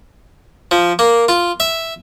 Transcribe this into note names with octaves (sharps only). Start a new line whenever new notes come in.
F3
A#3
F4
E5